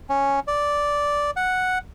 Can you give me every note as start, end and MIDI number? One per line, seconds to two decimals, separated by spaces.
0.09 0.40 61
0.48 1.31 74
1.36 1.78 78